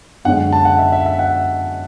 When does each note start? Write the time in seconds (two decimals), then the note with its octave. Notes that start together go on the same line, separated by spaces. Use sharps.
0.25 F#2 D3 G#3 C#4 F#5
0.53 A5
0.65 F#5
0.79 E5
0.92 E5
1.06 E5
1.19 F#5